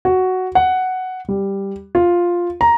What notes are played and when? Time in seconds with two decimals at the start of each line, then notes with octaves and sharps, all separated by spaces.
0.05 F#4
0.55 F#5
1.28 G3
1.95 F4
2.61 A#5